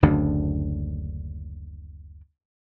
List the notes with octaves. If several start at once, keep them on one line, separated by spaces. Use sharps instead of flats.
F#1 D2 C#3 D4